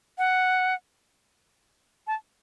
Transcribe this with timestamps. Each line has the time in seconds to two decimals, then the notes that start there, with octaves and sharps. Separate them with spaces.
0.18 F#5
2.07 A5